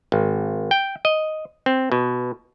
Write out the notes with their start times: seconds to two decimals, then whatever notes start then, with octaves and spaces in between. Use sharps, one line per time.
0.12 G#1
0.71 G5
1.05 D#5
1.66 C4
1.92 B2